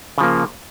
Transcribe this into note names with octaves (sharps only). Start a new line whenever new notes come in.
C#3 F3 A#3